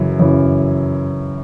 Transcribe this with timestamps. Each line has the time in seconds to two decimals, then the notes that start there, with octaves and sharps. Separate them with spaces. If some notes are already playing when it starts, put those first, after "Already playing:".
Already playing: F#2 C#3 E3 E4
0.19 F#2 C#3 E3